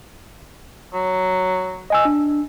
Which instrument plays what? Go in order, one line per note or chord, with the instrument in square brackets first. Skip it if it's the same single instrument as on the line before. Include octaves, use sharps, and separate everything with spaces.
[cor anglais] F#3
[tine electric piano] D#5 G#5 E6
D4